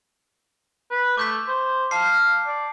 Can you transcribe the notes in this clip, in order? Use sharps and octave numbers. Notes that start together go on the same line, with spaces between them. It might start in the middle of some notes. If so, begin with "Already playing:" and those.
B4
A3 D6 G6 B6
C5
F5 A5 C7
D5